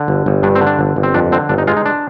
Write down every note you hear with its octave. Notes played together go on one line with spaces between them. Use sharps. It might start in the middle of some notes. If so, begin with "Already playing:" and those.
Already playing: D3
G1
G1
G2 D4
C4
D3
D4
G1
G1
C4
F2 D4
D3 C4
G1 D4
D#4
G#3 F4
D#4
D4